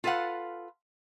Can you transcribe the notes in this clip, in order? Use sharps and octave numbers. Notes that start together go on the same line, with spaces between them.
F4 A4 B4 F5 F#5